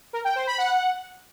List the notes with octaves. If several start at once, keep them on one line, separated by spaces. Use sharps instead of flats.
A#4
G5
C5
B5
F#5